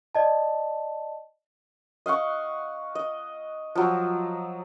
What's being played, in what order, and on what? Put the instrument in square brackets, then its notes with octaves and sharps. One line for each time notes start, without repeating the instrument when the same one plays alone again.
[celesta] D5 D#5 A5
[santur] D#5 F5 F#5 C#6
D#5
F3 F#3